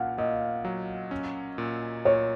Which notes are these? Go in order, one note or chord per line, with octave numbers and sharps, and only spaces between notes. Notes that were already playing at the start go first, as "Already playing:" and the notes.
Already playing: A#2 C#4 F5 F#5
A#2 D#5
F#3
C#4
A#2
A#2 C#5